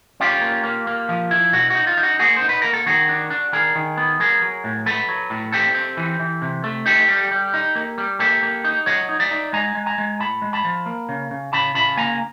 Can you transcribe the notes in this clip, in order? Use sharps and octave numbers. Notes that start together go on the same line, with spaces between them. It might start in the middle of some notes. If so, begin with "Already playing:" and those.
C#4 F4 G4
A#3
A#3
A#3
F3
E4
B2 F#4
D#4 F#4
F4
D#4
F#4
A#3 F#4 G#4
C5
D#4
B4
A#3 A#4
A4
D#3 F#4 G#4
D4
D4
D#3 G#4 A#4
D#3
B3
F#3 G#4 A#4
F#3
A2
F#3 A4 B4
F#3
A2
C4 G4 A4
C4
E3
E3
C3
A3
D#4 G4 A4
G3
G3
D#4
A#3
G3
A#3 G4 A4
A#3
D#4
F#3 C#5 D#5
D#4
D5 E5
D#4
G#3 G#5 A#5
G#3
G#5 A#5
G#3
A2 A5 B5
G#3
A5 B5
F3
A#3
C#3
C#3
C#3 A5 B5
C#3 A5 B5
A#3 G#5 A#5